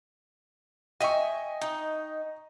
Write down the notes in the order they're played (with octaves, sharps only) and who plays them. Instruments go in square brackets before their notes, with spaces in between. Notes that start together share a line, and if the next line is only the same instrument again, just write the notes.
[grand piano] D#5 G5 C#6 [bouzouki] E5 G#5
[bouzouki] D#4